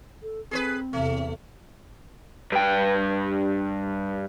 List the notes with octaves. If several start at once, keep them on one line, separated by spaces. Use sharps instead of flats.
A4
C4 G#4 A#4 B4
E2 C3 A3
G2 G5